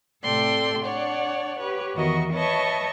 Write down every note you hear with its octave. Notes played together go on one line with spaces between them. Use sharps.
A2 C3 A4 D5 G5 C6
D4 C#5 D5 F#5
G4 B4 C#5
E2 D#3 F#4 D#5 E5 C#6
B4 C#5 D#5 E5 A5 C#6